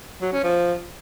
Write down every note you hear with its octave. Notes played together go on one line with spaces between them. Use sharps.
F#3
C#4
F3